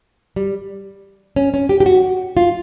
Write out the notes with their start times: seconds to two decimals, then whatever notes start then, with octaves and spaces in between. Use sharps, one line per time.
0.36 G3
1.36 C#4
1.54 C#4
1.69 G4
1.80 G4
1.86 F#4
2.37 F4